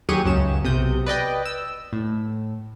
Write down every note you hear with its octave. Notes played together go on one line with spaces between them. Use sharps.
D#2 F#3 G4 G#4 C#6 D#7
C#2 F#2 C#4 E7
B1 C3 D#6 G6
B4 D5 D#5 G5
E6
A2